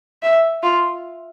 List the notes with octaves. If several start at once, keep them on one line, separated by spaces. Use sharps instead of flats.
E5
F4